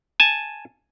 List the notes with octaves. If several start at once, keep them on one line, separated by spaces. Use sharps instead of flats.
G#5 A5